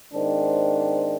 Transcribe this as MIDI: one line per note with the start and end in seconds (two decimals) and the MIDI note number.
0.13 1.16 44
0.13 1.16 51
0.13 1.16 60
0.13 1.16 62